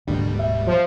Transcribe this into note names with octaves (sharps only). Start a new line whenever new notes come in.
D1 G#2 B2 D3 G3 A#3
E5
F3